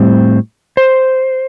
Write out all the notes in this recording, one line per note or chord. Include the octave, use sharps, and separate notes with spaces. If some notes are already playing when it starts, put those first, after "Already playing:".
Already playing: A2 G3 C4
C5